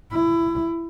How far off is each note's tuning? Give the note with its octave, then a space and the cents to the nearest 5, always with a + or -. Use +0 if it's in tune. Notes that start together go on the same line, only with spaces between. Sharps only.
E4 +20